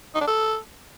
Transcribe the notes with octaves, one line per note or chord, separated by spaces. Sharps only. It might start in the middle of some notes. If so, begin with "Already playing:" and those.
D#4
D4
A4